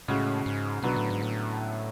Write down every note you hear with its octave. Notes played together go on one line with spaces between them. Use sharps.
A2 C#3 G#3 C#4 F#4
G#2
B2 D3 F#3 B3 F#4
A2
G#2
A2